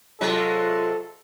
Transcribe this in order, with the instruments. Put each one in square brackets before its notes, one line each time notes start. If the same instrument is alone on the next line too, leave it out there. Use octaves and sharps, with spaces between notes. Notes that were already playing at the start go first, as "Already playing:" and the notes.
[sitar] C3 F#3 G#3 [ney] F4 [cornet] A4